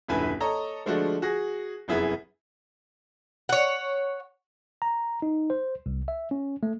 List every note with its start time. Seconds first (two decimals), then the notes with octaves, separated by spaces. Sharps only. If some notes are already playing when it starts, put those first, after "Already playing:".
0.08 D#1 F#2 D3 E4 B4 G#5
0.40 A4 C#5 D#5 A#5
0.86 D3 F3 G#3 A3 D4 F#4
1.22 F#4 G#4 A#6
1.88 F1 F#2 B3 E4 G#4
3.49 C#5 F#5
4.82 A#5
5.22 D#4
5.50 C5
5.86 C2
6.08 E5
6.31 C#4
6.63 A3